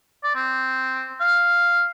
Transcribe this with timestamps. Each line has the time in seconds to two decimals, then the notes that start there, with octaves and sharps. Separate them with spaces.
0.23 D5
0.35 C4
1.20 F5